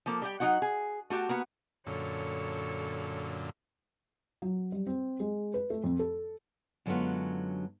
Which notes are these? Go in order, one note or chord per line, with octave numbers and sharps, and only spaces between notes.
F3 A#3 A4
G3 G4 G5
F#3 D#4 F#4 F#5
G#4
A3 F#4 G4 A5
A#3 B3 F#4
F#2 A#2 D3 A4 C#5
F#3
G3
C4
G#3
B4
A3
F2
A4
F#2 D3 F#3 G#3 B3 F4